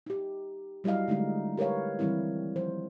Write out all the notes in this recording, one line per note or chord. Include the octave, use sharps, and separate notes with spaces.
D#4 G4
F#3 G3 E4 D#5 F5
D3 G#3 A3 D#4
G4 A#4 B4 C#5 F5
D#3 E3 G3 C4 E4
F3 C5